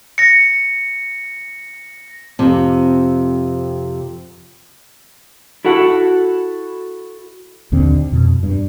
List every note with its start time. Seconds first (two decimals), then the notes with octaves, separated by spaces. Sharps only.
0.18 A#6 C#7
2.39 F2 C3
5.65 E4 F#4 A4 F#5
7.72 A#1 D#2 D3 C4
8.12 F2 B2
8.43 G2